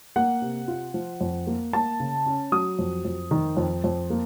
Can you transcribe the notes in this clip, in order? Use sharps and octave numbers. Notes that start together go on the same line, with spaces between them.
A#3 F#5
C3
F4
F3
F2
A#3
A#3 A5
C#3
C#4
F#3 D#6
F2
F2
D#3
F2
F2
A#3